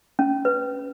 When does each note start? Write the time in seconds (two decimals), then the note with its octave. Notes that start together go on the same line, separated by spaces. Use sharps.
0.19 C#4
0.45 B4